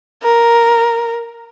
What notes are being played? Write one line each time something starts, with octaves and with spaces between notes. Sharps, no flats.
A#4